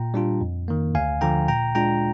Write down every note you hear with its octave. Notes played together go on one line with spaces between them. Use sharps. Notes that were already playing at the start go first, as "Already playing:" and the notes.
Already playing: A#2 G5 A#5
G3 D4 F4
F2
D#3 A#3
D2 F5 G#5
D3 F3 G5 A#5
A#2 G5 A#5
G#3 D4 F4 G5 A#5